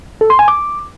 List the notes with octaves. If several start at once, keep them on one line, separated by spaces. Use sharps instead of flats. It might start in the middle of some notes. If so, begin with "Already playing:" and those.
A4
C6
G#5
D6